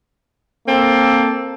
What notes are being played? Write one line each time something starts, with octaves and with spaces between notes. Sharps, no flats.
A#3 C4 A4